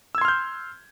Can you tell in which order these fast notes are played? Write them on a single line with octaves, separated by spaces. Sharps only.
E6 G#6 C6 F6 G6